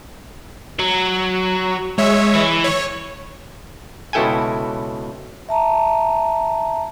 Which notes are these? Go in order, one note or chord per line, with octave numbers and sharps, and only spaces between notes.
F#3
G#3 C#5 E5
E3
C#5
C#2 B2 E4 A4 G5 G#5
E5 A5 A#5